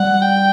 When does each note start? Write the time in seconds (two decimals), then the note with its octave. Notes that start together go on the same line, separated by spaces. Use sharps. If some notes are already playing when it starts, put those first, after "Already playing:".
Already playing: G3 F#5
0.22 G5